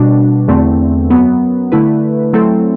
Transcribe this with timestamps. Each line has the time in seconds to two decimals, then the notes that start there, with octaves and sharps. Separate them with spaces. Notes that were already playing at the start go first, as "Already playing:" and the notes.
Already playing: B2 G3 D4 F#4
0.48 E2 D3 A3 C4
1.10 F#2 F#3 B3
1.72 D3 A3 E4 B4
2.33 F#3 A3 C4 E4 A4